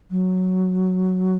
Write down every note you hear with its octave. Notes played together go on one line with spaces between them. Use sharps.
F#3